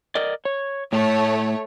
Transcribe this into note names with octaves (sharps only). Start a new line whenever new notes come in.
A#4 D5 D#5
C#5
A2 A3 C#5